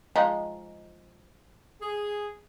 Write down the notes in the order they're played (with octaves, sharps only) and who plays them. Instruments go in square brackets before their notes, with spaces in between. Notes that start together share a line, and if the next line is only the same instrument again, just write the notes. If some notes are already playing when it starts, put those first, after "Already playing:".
[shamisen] F3 G#3 D#4
[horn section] G#4